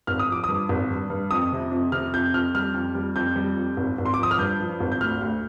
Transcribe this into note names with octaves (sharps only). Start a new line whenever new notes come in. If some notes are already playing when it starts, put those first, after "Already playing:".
G#1 F6
D#6
F3 D6
G2 D#6
G#1
G2
G2
F2 D#6
C3
F2
C3 F6
F2 G6
F2 F6
G3 F6
F2
G3
F2 G6
G3
F2
G#1
G#1
C6
D6
F3
D#6
F6
G2 G6
F3
G#1
G6
D2 F6
D2